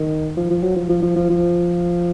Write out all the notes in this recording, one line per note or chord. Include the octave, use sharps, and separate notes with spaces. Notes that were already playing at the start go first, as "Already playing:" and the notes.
Already playing: D#3
F3
F3
F#3
F3
F3
F3
F3
F3